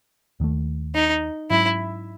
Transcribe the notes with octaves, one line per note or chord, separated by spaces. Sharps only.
D#2 D#3 A3
D#4
G#2 F#3 C#4 E4